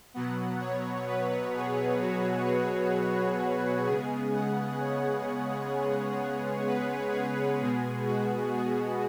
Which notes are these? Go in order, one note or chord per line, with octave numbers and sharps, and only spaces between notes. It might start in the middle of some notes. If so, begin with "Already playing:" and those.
B2 F#3 B3 F#5
C#5
B4
G#4
F#4
G#4
C#3 G#3 B3 G#4
F#5
C#5
B4
G#4
B2 G#3 B3 G#4
F#4
G#4